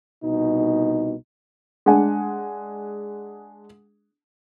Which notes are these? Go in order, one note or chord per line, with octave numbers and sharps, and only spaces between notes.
C2 B2 D#4
G#3 D4 F#5 G#5